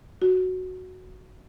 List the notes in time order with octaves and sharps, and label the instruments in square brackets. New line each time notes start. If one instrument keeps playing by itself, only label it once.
[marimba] F#4